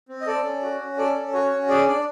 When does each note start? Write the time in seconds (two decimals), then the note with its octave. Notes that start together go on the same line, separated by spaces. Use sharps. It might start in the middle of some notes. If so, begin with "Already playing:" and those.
0.09 C4
0.21 D#5
0.27 A4 D5
0.44 C#4
0.62 F#4
0.79 C#4
0.98 A4 D5
1.16 C#4
1.33 F#4 C#5
1.51 C#4
1.69 G#4 D5
1.87 D4 D5